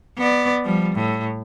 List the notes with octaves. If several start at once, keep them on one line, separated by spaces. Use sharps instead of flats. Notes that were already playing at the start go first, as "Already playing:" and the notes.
B3 D5
F3 G3
A2